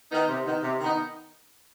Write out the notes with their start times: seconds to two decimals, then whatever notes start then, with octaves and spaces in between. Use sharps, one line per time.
0.11 D#3 B3 D#4
0.28 C3
0.45 D#3 B3 D#4
0.62 C3
0.80 D#3 B3 D#4